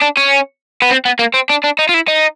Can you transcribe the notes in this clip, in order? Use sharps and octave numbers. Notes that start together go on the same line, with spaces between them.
D4
C#4
B3
C4
B3
A#3
C4
D4
D4
D#4
F4
E4
D#4